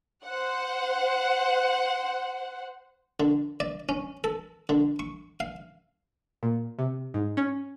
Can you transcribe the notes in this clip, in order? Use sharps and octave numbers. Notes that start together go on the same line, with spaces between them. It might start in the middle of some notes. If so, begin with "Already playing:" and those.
C5 F#5
D3
D5
C#4
A4
D3
C#6
F5
A#2
C3
G#2
C#4